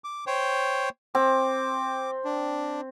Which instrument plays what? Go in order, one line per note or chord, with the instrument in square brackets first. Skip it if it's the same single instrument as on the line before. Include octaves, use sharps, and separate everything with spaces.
[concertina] D6
C5 C#5 G5
[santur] C4 [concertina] D6
[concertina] D4